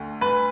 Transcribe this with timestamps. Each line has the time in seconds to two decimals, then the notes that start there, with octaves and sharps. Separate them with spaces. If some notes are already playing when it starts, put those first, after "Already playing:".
Already playing: D2 D3
0.21 B4 B5